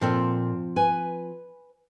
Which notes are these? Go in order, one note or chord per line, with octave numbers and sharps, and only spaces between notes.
A#2 F3 C4 A4
B4 G#5